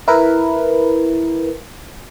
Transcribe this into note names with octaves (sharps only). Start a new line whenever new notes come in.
E4 A#4 B4